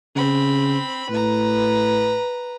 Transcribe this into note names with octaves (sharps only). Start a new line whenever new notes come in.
C#3 C4 B5
A2 B4 A#5